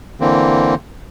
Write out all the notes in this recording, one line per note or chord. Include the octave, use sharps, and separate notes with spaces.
D3 E3 A#3 C4